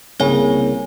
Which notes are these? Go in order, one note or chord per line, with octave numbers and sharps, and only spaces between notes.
C2 C#3 A#3 C#5 G#5